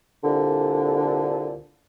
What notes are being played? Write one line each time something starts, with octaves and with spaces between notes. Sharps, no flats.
C2 A#2 D3